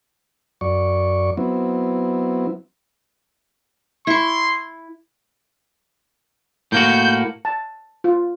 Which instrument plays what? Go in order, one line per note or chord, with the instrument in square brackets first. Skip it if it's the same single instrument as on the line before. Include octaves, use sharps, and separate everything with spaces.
[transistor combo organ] F#2 D5 C#6
F#3 B3 C4 E4
[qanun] E4 C#6 [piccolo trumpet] C6
[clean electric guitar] A2 A#3 F#4 [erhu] G6
[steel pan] A5
F4